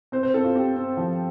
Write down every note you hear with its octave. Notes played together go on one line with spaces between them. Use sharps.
C4 C5
C5
C4 A4
F4
C4 G4
C4
F3